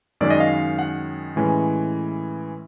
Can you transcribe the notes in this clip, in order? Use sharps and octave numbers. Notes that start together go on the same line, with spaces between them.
F#2 D#3 G#3 C#4 D5
D#5
F5
F#5
A2 E3 G#3 C#4